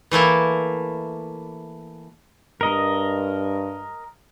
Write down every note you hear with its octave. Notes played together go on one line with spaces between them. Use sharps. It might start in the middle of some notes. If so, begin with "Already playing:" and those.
E3 A3 A#3 E4
G2 A#4 D#5